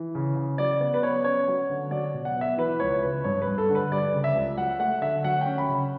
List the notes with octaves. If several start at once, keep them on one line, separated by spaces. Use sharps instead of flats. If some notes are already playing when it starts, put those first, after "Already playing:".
Already playing: E3
C#3
C#3
F#3 D5
B3 D5
B4
B3 C#5
C#4 C#5
F#3
D3
F#3 D5
B2
F#5
B3
E5
E3 B4
C#2 C#5
C#3 B4
G2 C#5
B4
G2
A4
D3
B4
G3 D5
C#3
E5
C#2
F#3 F#5
A3 F#5
D3 E5
F#3 F#5
C#4 G5
B5
C#3